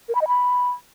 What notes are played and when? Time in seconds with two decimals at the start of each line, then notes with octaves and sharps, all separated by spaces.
0.09 A#4
0.15 B5
0.21 D#5
0.28 B5